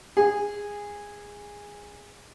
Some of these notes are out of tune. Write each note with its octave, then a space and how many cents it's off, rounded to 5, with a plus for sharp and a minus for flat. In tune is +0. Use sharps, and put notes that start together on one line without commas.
G#4 -15